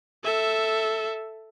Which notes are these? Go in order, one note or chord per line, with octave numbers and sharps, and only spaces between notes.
A4 E5